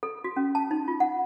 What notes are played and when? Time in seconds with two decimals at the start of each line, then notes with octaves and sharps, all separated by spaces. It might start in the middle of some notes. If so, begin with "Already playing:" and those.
0.03 A4
0.24 F#4
0.37 C#4
0.55 A5
0.71 D#4
0.88 F4
1.00 F#5